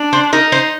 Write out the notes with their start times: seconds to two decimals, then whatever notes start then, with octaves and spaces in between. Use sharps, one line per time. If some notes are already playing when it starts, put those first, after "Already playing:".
Already playing: D4
0.13 C5
0.33 D#4 A#4
0.52 C5